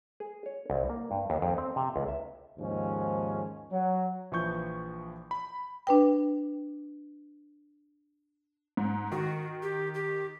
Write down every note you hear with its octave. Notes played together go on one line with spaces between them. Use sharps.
G#4
C#5
C2
A#3
G2
D#2
F2
C4
C3
C#2
E5
D#2 G#2 F3 C#4
F#3
A#1 E3 F3 C#6 G6
B5
D4 B4 G5
G#2
D#3 F#4
G4
G4